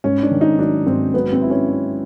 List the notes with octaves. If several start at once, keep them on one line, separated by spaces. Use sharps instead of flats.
G#2 C#4
D4
D#3
D#4
F#3 D4
G#2 C4
F#3 B3
C4
E4
C#4
E4